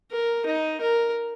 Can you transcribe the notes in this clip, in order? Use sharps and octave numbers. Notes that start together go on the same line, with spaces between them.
A#4
D#4
A#4